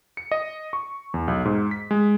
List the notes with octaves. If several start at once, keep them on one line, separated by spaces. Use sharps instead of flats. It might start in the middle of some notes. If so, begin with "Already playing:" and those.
C#7
D#5
C#6
E2
B1
G#2
B6
G#3